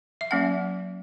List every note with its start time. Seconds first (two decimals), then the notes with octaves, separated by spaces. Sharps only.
0.21 E5
0.31 F#3 A#3 C#4 F#5